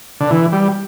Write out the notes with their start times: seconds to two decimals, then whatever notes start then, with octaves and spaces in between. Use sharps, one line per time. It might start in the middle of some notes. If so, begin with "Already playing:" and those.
0.20 D3
0.30 E3
0.52 G3